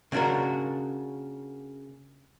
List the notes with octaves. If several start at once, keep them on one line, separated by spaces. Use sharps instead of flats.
C#3 A#3 D4 F#4 A#4